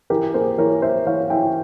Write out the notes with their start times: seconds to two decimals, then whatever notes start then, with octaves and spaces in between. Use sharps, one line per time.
0.10 E3 G4 A#4
0.34 A#3 G#4 C5
0.58 E3 A#4 C#5
0.82 A#3 C5 E5
1.06 E3 C#5 F5
1.30 E3 E5 G5